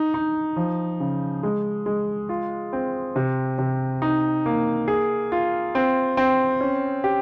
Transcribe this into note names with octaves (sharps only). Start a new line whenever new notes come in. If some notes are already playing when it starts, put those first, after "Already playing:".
Already playing: D#4
D#4
F3
C#3
G#3
G#3
F4
C4
C3
C3
D#4
A#3
G#4
F4
C4
C4
C#4
G4